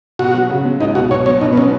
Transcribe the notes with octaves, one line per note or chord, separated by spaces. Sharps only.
B2 F#4
F#3
C#3
F#3
C#2 D#4
B2 F#4
B2 C#5
F#3 C#5
B2 D#4
B3
F#3 C#4